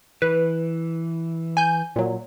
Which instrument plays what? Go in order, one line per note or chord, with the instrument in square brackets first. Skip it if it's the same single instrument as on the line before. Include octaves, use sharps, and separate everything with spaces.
[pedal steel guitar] E3 [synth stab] B4
[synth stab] G#5 G6
A#2 F#3